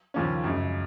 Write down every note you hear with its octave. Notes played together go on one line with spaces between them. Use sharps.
D#2 C#3 F3 A#3 C#4
F#2 C#3 G#3